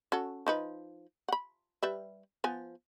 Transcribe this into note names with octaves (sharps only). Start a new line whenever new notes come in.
C#4 F#4 A4
F3 D#4 B4
F#5 B5
G3 B4 E5
F3 B3 G#5